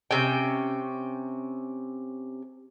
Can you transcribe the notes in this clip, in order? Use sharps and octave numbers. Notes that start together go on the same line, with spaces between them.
C3 C#4 G5